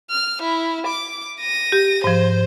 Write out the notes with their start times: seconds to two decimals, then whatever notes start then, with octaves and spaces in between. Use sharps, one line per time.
0.10 F6
0.42 E4
0.87 D6
1.40 A#6 D#7
1.72 G4
2.04 G#2 F3 C5